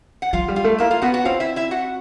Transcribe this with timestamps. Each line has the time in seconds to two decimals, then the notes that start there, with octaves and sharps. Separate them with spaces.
0.22 F#5
0.33 F#3 F4 F5
0.48 G3
0.56 F4 F5
0.64 A3
0.78 A#3 E4 E5
0.91 F4 F5
1.02 B3 F#4 F#5
1.14 F#4 F#5
1.25 C4 F4 F5
1.40 E4 E5
1.56 E4 E5
1.71 F#4 F#5